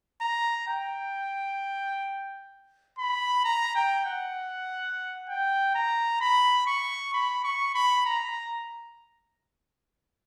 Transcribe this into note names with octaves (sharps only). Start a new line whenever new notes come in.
A#5
G5
B5
A#5
G5
F#5
G5
A#5
B5
C#6
B5
C#6
B5
A#5